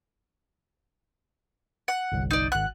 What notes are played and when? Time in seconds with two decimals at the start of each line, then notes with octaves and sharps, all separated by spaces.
1.88 F#5
2.12 G1 C2
2.31 D#4 D5
2.52 G#1 F#5 F#6